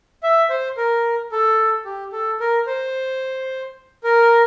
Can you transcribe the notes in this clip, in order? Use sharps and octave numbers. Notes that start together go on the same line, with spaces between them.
E5
C5
A#4
A4
G4
A4
A#4
C5
A#4